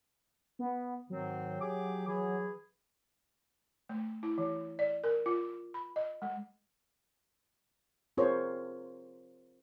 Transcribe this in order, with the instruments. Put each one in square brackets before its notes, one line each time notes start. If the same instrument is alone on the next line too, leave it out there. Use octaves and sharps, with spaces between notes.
[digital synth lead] B3
[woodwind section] G#2 D#3 C4 [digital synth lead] F#3
[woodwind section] G4 G#4 D6
E3 G#4
[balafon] A3
E4
E3
D5
A#4
F4
B5
D#5
G#3
[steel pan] C4 F4 G#4 A#4 C5 C#5